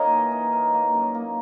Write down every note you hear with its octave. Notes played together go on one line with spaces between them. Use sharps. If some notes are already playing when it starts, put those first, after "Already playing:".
Already playing: A#3 A#4 C#5 D#5
E3
D#4
A#4
A#3
F#2
A#3